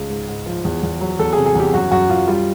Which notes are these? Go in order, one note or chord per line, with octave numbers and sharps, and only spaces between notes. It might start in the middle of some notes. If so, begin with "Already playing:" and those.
Already playing: C#2
G#2
G#2
F3
E2
E2
F#3
E2 A4
G#4
C3
G#4
E2 G4
F#2 F#4
F#2 F#4
F#2 F4
G3 F4